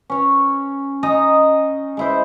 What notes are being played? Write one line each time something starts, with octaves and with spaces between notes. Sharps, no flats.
C#4 C#5
D#4 D#5 G#5 A#5
G#3 E4 C5